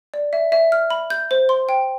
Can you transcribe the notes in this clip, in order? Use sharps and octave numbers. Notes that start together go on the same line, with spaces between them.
D5
E5
E5
F6
B5
G6
C5
C6
G5